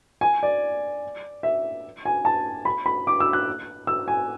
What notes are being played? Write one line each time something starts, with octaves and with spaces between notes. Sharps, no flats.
G#5
D5
E5
G#5
A5
B5
B5
D6
E6
F#6
E6
G#5